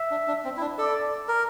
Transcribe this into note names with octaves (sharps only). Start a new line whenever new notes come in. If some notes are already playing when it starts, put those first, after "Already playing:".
Already playing: E5
D4
D4
C4
E4
D4
A4 D5
A#4